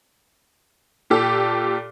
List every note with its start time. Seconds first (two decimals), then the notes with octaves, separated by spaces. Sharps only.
1.10 A#2 G4 A4